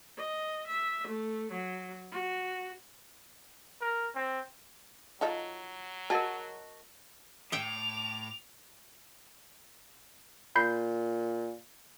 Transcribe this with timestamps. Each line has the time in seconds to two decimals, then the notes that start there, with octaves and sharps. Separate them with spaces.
0.17 D#5
0.67 E5
1.07 A3
1.52 F#3
2.11 F#4
3.81 A#4
4.15 C4
5.21 F#3 D#4 F4 A4
6.10 F#4 G#4 A#4 D#5 A5
7.52 A2 E5 G5 D6 F7
10.56 A#2 B5 G6 C7